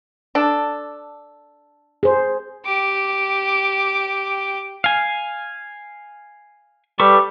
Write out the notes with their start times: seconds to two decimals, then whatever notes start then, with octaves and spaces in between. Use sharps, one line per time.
0.35 D4 A4
2.03 G#4 C5
2.65 G4 D6
4.84 F5 G#5
7.00 G3 A4 B4 C#6